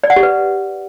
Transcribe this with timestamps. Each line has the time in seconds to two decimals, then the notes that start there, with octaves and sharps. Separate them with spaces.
0.04 D5
0.10 F#5
0.16 G4
0.23 B4